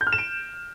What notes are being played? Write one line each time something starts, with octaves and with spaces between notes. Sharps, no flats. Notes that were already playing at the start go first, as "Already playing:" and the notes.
G6
F6
E7
D7